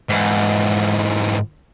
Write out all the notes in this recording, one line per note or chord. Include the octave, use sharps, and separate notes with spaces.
G#2 E3